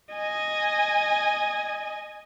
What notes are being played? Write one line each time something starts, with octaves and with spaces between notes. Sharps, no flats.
D#5 G#5